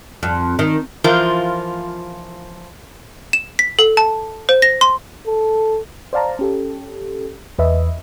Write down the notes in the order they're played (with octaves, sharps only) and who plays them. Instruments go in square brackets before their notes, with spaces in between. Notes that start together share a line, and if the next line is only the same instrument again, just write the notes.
[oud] F2
D#3
[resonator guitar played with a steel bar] E3 F3 F4 A#4 C5
[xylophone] E7
B6
A4
A5
C5
A#6
C6
[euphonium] A4
[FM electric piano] C5 D5 F5 A5 A#5
C#4 G4 A4
E2 B4 D#5 E5